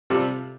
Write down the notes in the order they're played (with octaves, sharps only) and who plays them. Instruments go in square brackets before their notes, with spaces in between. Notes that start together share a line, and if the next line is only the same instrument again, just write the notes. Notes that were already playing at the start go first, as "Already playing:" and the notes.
[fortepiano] C3 G3 C4 F4 A4